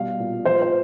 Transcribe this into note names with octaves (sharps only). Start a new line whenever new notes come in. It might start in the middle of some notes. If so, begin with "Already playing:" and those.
Already playing: B2 G3 F5
A#2
F3 C5
C5